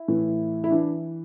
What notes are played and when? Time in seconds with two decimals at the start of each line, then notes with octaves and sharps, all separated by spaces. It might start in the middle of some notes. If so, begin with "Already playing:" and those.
Already playing: E4
0.08 A2 E3
0.64 E4
0.70 E3 D4